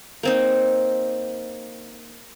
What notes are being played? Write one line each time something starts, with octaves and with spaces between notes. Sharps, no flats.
A#3 C4 D#4